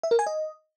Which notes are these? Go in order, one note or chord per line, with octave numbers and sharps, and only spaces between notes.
E5
A#4
G#5
D#5